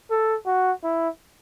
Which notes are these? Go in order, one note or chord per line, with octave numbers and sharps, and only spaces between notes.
A4
F#4
E4